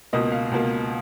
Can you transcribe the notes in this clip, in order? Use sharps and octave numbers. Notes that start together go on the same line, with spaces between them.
C#2 B2 A#3 D#5
F5
C#2 B2 A#3